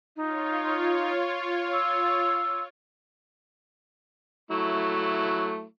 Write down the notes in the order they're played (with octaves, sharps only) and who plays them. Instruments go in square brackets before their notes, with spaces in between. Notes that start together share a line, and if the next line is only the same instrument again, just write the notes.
[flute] D#4 [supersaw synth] F4 C#5
[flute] E6
[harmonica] F#3 A3 E4